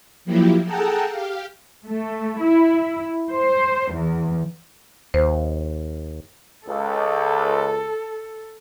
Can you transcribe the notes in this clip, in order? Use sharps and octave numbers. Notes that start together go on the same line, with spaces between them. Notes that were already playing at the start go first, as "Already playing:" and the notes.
F3 F#3 A#3 E4 G4
G#4 A4 F#5 G5 A5 A#5
G4 F5
A3
E4
C5
E2
D#2 C5
C#2 A4